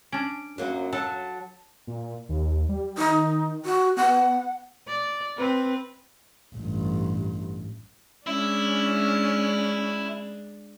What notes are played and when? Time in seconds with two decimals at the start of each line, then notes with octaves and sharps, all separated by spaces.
0.12 C#4 D4 D7
0.58 F#2 F#3 A#3
0.93 F#3 A4 A5
1.87 A#2
2.29 D#2
2.69 G3
2.98 D#3 D#4
3.65 F#4
3.97 B3 F#5
4.87 D5
5.37 C4 B4
6.55 A1 G2
8.27 G#3 C#4 D4 E4